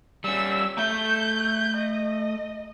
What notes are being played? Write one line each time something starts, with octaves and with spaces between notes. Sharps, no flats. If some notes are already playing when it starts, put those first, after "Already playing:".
G3 C#4 E6
A3 E5 G6
D#5